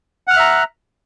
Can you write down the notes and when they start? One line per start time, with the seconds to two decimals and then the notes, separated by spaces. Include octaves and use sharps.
0.27 F#5
0.30 F6
0.33 F#6
0.36 E5
0.39 A#5